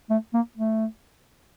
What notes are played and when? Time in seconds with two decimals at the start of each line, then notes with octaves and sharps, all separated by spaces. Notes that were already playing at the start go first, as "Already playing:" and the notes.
0.10 A3
0.34 A#3
0.57 A3